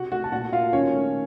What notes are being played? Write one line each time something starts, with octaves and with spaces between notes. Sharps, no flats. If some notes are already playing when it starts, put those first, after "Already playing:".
Already playing: C3 F#4 F#5
A3 F#4 F#5
A5
A#2 F#4 F#5
A#3 F4 F5
D#3 C#4 C#5
A3